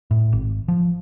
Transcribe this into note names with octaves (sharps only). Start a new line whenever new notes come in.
A2
G#1
F3